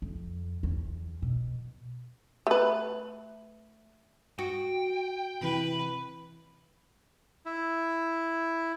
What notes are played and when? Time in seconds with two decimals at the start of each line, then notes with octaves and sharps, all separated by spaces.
0.02 F2
0.63 E2
1.22 B2
2.47 A3 B4
4.39 F#4 G5
5.41 C3 E3 B4
7.46 E4